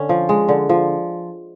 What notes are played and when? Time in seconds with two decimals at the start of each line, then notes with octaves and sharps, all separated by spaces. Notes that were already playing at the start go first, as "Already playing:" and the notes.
Already playing: D3 C#4
0.09 F3
0.29 G#3
0.48 D3
0.69 F3